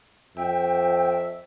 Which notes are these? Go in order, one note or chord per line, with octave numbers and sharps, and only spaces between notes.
F2 E5 G5